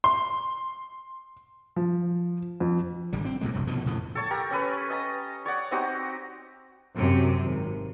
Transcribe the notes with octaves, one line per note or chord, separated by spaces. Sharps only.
C6
F3
F2
G#1 D3 G3
C4
F#2 A#2 D3 G#3
F1 C2 G2 F#3
B2 D3 D#3 F3
F2 A2 C#3 F3
A4 C#5 A5
G4 A#4 A#5
C#4 A4 B4 C#5
D#5 A5 A#5
C#5 D5 F#5
C4 D#4 F#4 G4
F#2 C3
G#1